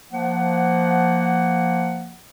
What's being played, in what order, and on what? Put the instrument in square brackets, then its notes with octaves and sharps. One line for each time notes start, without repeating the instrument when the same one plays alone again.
[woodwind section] F3 A#3 F#5